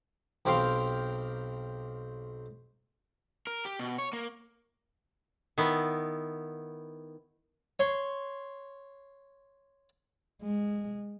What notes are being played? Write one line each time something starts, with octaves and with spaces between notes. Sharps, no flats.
B1 C4 G4 A#4 F5 C6
A#4
G4
B2
C#5
A#3
D#3 B3 E4
C#5 C6
G#3